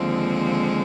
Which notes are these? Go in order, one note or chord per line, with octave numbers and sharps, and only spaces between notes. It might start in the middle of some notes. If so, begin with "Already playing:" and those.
Already playing: D#2 D3 F3 G#3 C4